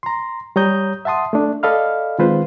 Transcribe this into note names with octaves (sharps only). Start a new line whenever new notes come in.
A#5 C6
G3 C#5 A#5 D#6 G6
E5 F#5 A5 C6 D#6
A3 D4
A4 D5 D#5 F5 B5 F6
D#3 G#3 C4 F4 B4 C5